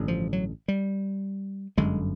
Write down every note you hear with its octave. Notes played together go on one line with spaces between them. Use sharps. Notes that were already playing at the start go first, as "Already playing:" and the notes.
Already playing: A1 G2 D3
F3
F#3
G3
G1 F#2 D3 G#3